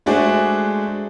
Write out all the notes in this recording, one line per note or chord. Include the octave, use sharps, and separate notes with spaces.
G#3 A3 D4 F#4 G#4 C5